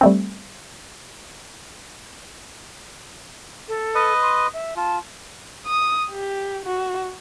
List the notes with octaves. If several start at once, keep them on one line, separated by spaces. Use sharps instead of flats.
G3 A3 C4
A4
B4 D#5
C6
E5
F4 A5
D#6
G4
F#4